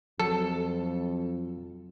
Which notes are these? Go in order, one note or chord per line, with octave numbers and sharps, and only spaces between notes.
F2 F#3 A4